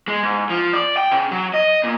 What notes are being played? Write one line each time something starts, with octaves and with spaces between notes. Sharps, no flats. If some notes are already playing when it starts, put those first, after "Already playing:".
G#3
G#2
F3
D5
G5
C#3
F#3
D#5
A#2